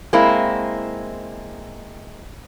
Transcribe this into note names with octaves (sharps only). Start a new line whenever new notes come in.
G#3 A#3 C4 E4